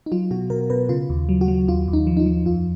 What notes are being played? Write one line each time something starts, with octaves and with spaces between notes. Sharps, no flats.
D#4
F#3 F4
B2 F#4
B2 A#4
B2 B4
C#3 F4
D#2
F#3
F#4
F#3
D#2 F4
D#2
D#4
F3
D#4
F4
F3
F2 F4